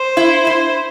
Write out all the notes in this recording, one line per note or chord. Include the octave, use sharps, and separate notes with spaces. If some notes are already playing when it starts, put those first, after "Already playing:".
Already playing: C5
E4
E4